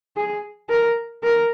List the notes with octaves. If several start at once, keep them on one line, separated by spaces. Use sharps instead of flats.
G#4
A#4
A#4